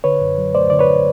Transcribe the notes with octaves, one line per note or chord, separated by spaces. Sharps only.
D3 B4 C#5
F#2
F#3
A3 C5 D5
D3 D5
B4 C#5